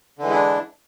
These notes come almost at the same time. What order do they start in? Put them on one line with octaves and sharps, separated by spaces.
D3 E3 G#3 E4 D4